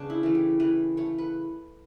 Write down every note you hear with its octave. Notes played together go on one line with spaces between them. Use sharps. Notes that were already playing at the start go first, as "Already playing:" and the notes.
Already playing: C#3 B3 D4
E4
E3 A3
G4
E3 B4
A3 C#5
B4